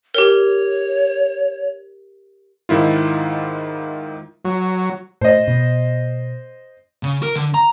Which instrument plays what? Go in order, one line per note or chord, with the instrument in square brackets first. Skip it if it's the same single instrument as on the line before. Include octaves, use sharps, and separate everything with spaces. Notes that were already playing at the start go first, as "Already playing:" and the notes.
[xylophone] G4 A#4 [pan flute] C#5
[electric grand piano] G#2 D#3 E4 F4
[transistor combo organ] F#3
[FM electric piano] A2 [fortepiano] C5 D#5
[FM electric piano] B2
[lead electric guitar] C#3
A#4
D3
A#5